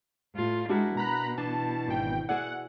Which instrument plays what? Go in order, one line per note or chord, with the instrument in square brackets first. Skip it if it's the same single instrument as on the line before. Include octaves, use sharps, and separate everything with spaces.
[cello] A2 F4
[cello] G#3 E4 [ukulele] D4 F#4 A#4
[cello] B2 [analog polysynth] A#5 B5 F#6
[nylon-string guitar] E3 [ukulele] D4 [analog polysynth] A5
[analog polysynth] G#1 G5
[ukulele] E4 [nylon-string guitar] F#4 G#4 D5 [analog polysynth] F#5